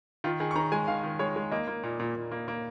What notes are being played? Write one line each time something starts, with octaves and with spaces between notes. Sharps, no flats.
D#3 F4
D#3 G#4
C#6
D#3 A#5
G#3 G#5
D#3 F5
D#3
G#3 C#5
G#3
A#3 D#5
A#3
A#2
A#2
A#2
A#3
A#3